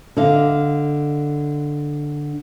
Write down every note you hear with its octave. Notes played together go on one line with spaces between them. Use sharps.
D3 D#5 F5